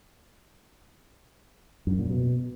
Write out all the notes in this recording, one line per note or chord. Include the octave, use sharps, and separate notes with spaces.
F#2
A#2
B2